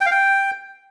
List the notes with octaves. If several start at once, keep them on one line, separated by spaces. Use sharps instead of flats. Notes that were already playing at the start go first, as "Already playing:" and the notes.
G5
F5
G5